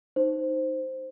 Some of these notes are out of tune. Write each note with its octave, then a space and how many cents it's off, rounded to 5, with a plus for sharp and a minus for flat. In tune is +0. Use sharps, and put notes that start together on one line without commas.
D#4 +0 C5 +0